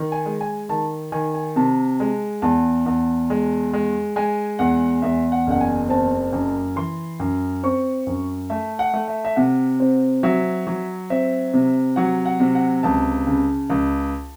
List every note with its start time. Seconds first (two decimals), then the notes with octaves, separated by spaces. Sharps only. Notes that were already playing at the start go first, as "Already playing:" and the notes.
Already playing: D#3
0.12 G#5
0.26 G#3
0.41 G#5
0.69 D#3 A5
1.12 D#3 G#5
1.34 G#5
1.56 C3 A5
2.00 G#3
2.42 E2 A5
2.86 E2
3.30 G#3
3.73 G#3
4.16 G#3 G#5
4.59 E2 F#5
5.02 E2 E5
5.32 F#5
5.47 F#1 F#5
5.61 G#5
5.89 C4 A5
6.33 F#2
6.76 E3 C6
7.20 F#2
7.63 C4 C#6
8.07 F#2
8.50 A3 E5
8.79 F#5
8.94 A3
9.08 E5
9.25 E5
9.36 C3 F#5
9.80 C4
10.23 F#3 E5
10.67 F#3
11.10 C4 E5
11.54 C3
11.96 F#3 F#5
12.26 F#5
12.40 C3
12.55 F#5
12.83 C#2 A5
13.27 C#3
13.70 C#2